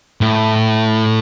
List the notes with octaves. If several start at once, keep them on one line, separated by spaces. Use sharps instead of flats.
A2